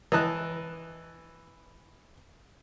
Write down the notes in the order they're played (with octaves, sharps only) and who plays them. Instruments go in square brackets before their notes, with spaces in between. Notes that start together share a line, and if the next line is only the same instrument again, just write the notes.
[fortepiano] E3 D#5 A5 F#6